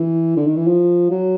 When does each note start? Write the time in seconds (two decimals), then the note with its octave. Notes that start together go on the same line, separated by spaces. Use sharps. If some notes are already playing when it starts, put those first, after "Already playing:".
Already playing: E3
0.37 D3
0.47 D#3
0.57 E3
0.67 F3
1.11 F#3